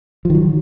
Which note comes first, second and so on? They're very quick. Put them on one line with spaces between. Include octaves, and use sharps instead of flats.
F3 D#3 F#3